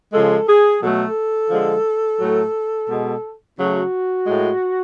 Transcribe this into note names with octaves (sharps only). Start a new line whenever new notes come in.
C#3 F3 G#3 A4
G#4
B2 F#3 A3 A4
D3 F3 G#3
A2 F#3 A3
B2 G#3
C#3 F#3 A3 F#4
A2 G#3